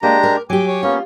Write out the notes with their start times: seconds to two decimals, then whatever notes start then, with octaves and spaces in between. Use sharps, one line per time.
0.03 G#3 A#3 D4 G4 A#5
0.23 A#4
0.50 F#3 G4 G5 G#5 D6
0.68 C#5
0.83 A#3 B3 C#4 F4